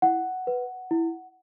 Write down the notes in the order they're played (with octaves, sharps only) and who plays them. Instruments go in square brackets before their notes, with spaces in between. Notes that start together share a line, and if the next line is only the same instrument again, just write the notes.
[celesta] E4 F#5
B4
E4